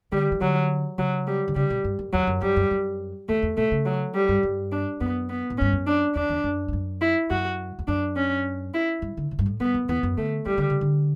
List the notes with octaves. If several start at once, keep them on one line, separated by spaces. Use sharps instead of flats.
D3 G3
E3
D3 F#3
C#3 F#3
G3
D3
C#3 G3
B2
G2
F#2
E2 F#3
F#2
G2 G3
F#2
F#2
E2 A3
E2
B2 A3
C#3
F#3
G3
G2
G2
D4
F#2 B3
B3
A2
G2 C#4
F#2
D4
E2 D4
E2
F#2
G2
F#2
E4
F#2 F#4
E2
F#2 D4
C#4
E4
G2
D3
C#3
G2
A2
G2 B3
F#2
E2 B3
F#2
D3 A3
E3 G3
D3
C#3
D3